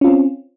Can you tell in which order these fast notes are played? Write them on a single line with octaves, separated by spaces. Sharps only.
C#4 F4 C4